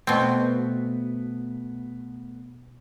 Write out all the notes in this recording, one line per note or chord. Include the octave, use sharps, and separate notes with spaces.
B2 A3 B3 C4